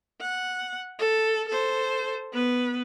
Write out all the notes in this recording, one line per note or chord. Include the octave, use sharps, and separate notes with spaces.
F#5
A4
A4 C5
B3 B4